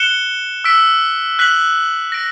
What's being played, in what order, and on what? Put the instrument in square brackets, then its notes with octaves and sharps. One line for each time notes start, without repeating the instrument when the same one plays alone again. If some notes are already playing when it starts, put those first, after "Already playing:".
Already playing: [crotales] F#6 C#7 E7 G7
E6 B6 D7
F#6 B6 F#7
A#6 D7